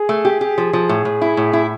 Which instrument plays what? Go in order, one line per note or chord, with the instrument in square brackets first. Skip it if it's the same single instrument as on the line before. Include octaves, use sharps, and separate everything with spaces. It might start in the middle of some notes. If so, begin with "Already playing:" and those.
Already playing: [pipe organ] G#4
[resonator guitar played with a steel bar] A3
G4
G4
F3
F3
A2
A2
E4
A2
E4